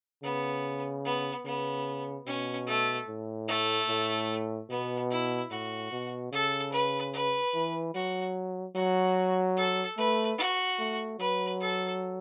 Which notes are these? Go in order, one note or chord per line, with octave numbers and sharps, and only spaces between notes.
C#3 B3
B3
C#3 B3
B2 C#4
A3
A2
A3
A2
B2 B3
E4
A2 F#4
B2
C#3 A4
B4
B4
E3
F#3 F#4
F#3 F#4
A4
A3 B4
F#4
A3
F#3 B4
A4